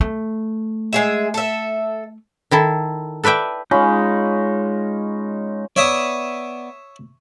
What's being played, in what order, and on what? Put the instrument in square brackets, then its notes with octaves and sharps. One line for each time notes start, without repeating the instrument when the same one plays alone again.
[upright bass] A3
[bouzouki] G#3 G#4 E5
A4 E5
[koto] D#3 E4 A4
A4 B4 D5 E5 G5
[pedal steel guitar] G#3 D#4 [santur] C#4 F4 B5
[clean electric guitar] B3 D5 [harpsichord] C#5 E5 D#6